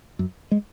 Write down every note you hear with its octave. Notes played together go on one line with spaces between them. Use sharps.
F#2
G#3